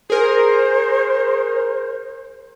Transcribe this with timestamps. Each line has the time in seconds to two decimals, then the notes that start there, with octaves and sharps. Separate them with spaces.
0.10 G#4 A#4 C5